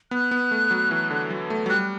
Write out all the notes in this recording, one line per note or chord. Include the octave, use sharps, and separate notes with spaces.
B3 F#6
B3
A3
F#3
E3
D3
F#3
A3
F#3
G3 F#6